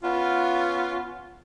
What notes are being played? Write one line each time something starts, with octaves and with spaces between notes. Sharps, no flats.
B3 C#4 F4